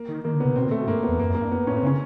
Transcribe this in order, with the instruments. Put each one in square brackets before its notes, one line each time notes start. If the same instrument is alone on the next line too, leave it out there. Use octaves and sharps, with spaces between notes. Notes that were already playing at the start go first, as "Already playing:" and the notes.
Already playing: [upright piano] A#3
[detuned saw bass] D#3
[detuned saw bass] D#3 [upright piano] A#3
[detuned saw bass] D3
[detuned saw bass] C3 [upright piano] B3
[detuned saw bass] B2 [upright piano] C4
[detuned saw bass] A#2
[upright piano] A3
[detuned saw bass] B2
[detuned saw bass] G2 [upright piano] A#3
[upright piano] B3
[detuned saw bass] E2
[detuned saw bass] F#2 [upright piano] A#3
[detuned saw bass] F#2
[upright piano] A#3
[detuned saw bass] G2
[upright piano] B3
[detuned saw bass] A2 [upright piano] C#4
[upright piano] C4
[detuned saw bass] C#3 [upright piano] C#4